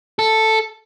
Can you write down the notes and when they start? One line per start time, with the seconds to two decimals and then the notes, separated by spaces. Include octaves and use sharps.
0.19 A4